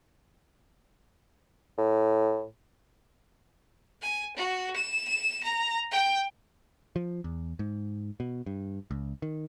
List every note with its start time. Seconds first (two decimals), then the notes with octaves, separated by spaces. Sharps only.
1.78 A2
4.02 G#5
4.36 F#4
4.76 E7
5.08 E7
5.43 A#5
5.91 G5
6.96 F3
7.24 E2
7.59 G#2
8.20 B2
8.46 G2
8.91 C#2
9.22 D#3